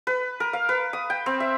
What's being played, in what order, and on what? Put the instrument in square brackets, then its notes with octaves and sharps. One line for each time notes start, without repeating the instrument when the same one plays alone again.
[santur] B4
A#4
F5
B4
D#6
G5
C4
E5